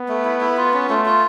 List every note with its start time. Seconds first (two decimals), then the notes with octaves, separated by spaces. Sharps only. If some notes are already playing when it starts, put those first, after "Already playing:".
Already playing: B3
0.08 A3
0.24 E4
0.41 E4
0.57 F4
0.74 C#4
0.89 A3 F4
1.05 F4